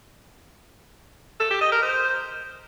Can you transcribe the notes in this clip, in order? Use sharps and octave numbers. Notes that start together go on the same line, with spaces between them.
A4
G4
D#5
A#4
C5